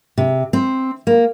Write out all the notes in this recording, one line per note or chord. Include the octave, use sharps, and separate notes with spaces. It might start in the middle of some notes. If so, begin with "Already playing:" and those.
C3
C4
A#3